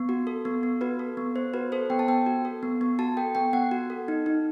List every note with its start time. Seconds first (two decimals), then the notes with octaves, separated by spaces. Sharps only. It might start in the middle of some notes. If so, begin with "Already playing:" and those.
Already playing: B3
0.09 F#4
0.27 A4
0.45 B3
0.63 B3
0.81 F#4 B4
0.99 A4
1.17 B3
1.36 B3 C5
1.54 F#4 B4
1.72 A4 C5
1.90 B3 G5
1.99 A5
2.08 B3 G5
2.26 F#4
2.45 A4
2.63 B3
2.81 B3
2.99 F#4 A5
3.17 A4 G5
3.35 B3 G5
3.53 B3 F#5
3.71 F#4
3.90 A4
4.08 D#4
4.26 D#4